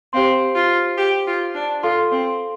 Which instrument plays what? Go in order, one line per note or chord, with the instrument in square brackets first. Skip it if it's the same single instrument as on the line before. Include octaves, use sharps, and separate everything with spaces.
[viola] C4 [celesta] G4 C5 F5 C6
[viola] F4
G4
F4
D4
[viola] F4 [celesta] A4 F5 C6
[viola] C4